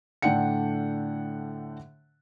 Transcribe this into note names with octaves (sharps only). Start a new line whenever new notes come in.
A2 D3 D4 F#5 G5 C#7